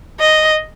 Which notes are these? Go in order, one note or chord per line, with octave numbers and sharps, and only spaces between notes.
D#5